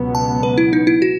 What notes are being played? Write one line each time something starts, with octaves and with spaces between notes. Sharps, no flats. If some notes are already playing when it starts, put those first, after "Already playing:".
Already playing: C#2 B2 F#3 B3
A5
B4
E4
D#4
E4
F#4